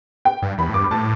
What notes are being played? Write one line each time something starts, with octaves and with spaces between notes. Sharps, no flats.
G5
G2
E2 B5
A2
G2 D6
B5
A2 A5